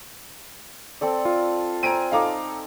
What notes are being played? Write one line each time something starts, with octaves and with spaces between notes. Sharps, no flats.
C4 A4 D5
F4
C4 G#5 A#5 D7 D#7
D#4 A4 F5 A5 A#5 D6